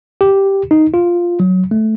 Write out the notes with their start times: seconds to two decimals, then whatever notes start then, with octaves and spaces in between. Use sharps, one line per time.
0.21 G4
0.71 D#4
0.94 F4
1.40 F#3
1.71 A3